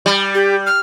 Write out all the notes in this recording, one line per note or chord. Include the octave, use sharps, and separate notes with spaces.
G3
G4
F6